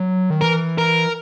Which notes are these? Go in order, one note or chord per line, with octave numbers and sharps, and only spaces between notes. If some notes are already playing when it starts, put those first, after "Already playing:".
Already playing: F#3
D#3
E3 A#4
A#4